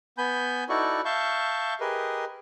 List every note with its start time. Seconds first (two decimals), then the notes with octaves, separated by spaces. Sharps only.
0.18 B3 G#5 B5 G6
0.69 D#4 E4 F#4 A4 D5 C#6
1.05 E5 F5 A5 C#6 G6
1.80 G4 G#4 A#4 B4 D#5